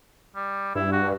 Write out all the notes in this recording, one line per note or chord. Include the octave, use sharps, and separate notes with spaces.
G3
G2 E4
F#4